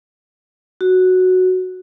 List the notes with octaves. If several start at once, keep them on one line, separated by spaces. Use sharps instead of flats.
F#4